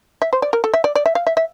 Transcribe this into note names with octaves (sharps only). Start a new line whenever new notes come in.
E5
C5
D5
A#4
A4
E5
D5
D5
E5
F5
E5
E5